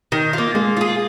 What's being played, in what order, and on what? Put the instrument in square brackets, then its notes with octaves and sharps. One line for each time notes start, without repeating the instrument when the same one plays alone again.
[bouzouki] D#3
A#3 F4
[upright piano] G#3 [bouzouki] A#3
[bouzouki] F4 G#4